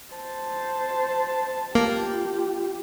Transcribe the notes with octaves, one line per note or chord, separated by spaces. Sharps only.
C5 A5
A#3 F4 G4